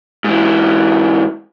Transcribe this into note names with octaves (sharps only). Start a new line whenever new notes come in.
G#2 E3